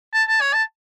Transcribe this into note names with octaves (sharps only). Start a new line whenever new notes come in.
A5
A5
C#5
A5